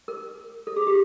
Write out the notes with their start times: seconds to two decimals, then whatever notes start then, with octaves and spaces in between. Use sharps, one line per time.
0.08 A#4
0.67 A4
0.77 G#4
0.87 G4